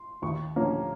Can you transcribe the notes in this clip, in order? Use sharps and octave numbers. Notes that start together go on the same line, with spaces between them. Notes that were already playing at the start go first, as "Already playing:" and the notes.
Already playing: C6
D#2 C#6
D3 F3 A#3 C#4